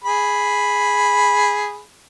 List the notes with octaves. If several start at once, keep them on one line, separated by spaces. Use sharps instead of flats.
G#4 B5